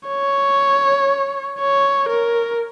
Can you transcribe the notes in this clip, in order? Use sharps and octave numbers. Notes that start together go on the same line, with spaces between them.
C#5
C#5
A#4